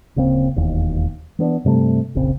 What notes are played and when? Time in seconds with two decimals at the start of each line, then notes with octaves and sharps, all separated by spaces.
0.16 D1 C#3 A#3 C4
0.56 E1 D#2
1.39 E3 B3 D4
1.65 G2 C3 G3 A3
2.15 F1 A#1 C#3 C4